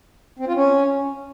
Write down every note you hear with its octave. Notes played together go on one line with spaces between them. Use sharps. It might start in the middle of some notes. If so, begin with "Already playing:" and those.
C4
F4
C#4